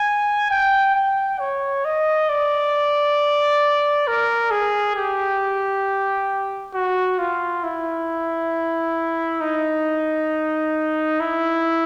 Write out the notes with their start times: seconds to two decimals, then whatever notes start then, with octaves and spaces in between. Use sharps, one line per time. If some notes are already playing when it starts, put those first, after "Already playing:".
Already playing: G#5
0.50 G5
0.95 G5
1.40 C#5
1.85 D#5
2.29 D5
4.07 A#4
4.51 G#4
4.96 G4
6.74 F#4
7.18 F4
7.64 E4
9.41 D#4
11.20 E4